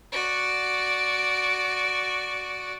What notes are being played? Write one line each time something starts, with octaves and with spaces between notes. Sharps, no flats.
F#4 D5